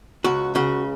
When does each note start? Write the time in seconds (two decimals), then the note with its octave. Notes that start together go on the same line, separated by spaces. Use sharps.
0.24 C#2 F#4
0.55 C#3 F#4